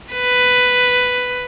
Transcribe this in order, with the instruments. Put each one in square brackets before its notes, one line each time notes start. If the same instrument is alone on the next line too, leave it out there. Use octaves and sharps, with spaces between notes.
[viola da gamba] B4